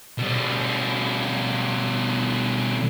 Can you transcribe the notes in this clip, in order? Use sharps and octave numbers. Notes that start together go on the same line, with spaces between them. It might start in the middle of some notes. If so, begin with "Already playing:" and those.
B2 G3